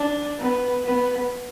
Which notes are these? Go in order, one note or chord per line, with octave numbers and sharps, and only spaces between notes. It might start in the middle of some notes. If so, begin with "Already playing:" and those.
Already playing: D4
B3
B3